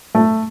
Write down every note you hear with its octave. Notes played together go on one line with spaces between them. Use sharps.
A3